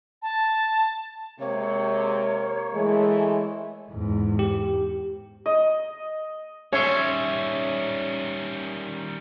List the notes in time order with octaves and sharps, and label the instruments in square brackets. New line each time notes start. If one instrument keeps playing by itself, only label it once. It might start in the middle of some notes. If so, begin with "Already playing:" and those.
[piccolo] A5
[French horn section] C3 G#3 [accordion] A#3 [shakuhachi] C#5
[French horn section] E3 A3 [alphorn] G#3
[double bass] E2 G#2
[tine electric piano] G4
[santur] D#5
[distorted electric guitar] D#3 G3 [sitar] C#4 E5 [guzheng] C#5 C6